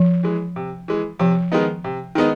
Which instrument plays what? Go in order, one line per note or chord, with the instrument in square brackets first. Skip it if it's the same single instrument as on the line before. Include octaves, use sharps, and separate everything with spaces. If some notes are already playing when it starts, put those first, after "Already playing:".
Already playing: [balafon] F3
[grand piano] E3 G#3
C3
E3 G#3
[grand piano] C3 [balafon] F3
[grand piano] D#3 G#3 B3 D#4
C3
D#3 G#3 B3 D#4